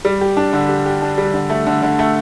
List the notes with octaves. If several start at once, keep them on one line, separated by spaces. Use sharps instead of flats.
G3
G4
D4
D3
G4
G4
D4
G3
D3
A3
D3
D3
A3